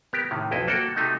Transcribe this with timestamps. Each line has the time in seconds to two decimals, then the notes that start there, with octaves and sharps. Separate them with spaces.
0.13 B3 G4 A#4
0.31 A2 C3 D#3
0.51 B1 F2 E4 D#5
0.68 A#3 F#4 A4 G5
0.95 C3 A3 D#4 F#4